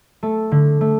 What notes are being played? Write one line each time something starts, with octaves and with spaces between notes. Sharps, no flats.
A3 A4
D3
A3